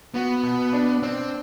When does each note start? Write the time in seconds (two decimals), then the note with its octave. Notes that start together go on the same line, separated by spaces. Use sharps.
0.14 B3 F#4
0.43 B2
0.73 D4
1.02 C4 D4